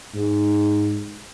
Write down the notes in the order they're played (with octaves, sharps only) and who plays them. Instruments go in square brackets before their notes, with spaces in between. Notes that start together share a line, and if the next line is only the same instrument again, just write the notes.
[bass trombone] G#2